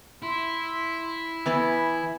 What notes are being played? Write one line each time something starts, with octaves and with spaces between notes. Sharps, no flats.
E4 C6
E3 B3 B4 G#5